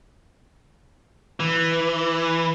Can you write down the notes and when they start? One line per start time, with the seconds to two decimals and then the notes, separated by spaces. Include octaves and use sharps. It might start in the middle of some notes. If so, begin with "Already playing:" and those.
1.40 E3